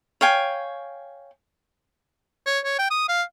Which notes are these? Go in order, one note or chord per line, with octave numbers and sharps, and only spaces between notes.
C#5 F5 G5 G#5
C#5
C#5
G5
D#6
F5